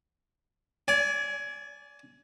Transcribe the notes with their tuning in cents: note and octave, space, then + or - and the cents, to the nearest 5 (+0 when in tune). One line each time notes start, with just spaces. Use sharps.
D5 -20 G#5 +15